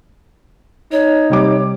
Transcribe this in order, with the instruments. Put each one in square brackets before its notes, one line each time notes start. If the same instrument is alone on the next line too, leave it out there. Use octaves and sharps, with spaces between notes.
[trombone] D#4 [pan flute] C#5
[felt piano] C3 G3 D6